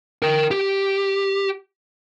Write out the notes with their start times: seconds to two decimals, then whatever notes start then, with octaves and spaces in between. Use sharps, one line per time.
0.22 A#4 G5
0.51 G4